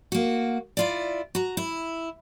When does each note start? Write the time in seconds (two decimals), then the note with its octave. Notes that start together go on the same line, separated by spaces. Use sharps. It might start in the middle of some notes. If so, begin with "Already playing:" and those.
0.12 A#3 F#4
0.77 E4 F4 D5
1.35 F#4 A#5
1.57 E4